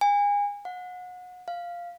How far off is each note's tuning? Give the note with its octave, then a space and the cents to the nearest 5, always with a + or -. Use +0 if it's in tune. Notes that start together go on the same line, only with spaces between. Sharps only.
G#5 -30
F#5 -30
F5 -5